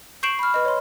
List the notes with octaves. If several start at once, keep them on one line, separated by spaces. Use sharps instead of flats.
C#6 G6 C7 D7 E7 F#7
B5 F6
B4 D#5
C#5 C6